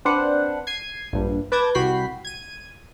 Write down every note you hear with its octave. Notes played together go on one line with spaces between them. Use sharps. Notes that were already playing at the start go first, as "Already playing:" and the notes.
C4 D4 B4 C5 F#5
G#6 C7 D#7
A#1 G2
B4 A5 D6 G6 G#6 A#6
C2 F#4 G5 B5 B6 C7
G#6 D#7